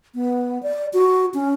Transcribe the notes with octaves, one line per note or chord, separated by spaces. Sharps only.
B3
D5
F#4
C#4